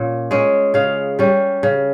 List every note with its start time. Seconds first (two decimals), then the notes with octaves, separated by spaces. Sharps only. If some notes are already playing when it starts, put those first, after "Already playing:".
Already playing: A#2 C#4
0.31 G#3 C#4
0.74 C#3 F5
1.19 G3 C#4
1.63 C#3